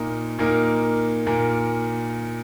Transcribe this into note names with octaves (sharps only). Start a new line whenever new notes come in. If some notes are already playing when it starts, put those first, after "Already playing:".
Already playing: A#2 A#3 D#4 A#4
A#2 A#3 D#4 A#4
A#2 A#3 A#4